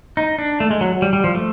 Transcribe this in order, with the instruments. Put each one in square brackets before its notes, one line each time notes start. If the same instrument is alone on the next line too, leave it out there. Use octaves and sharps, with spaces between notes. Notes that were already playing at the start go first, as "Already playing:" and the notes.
[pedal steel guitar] D#4
D4
A3
G#3
F#3
G3
G3
F3
A3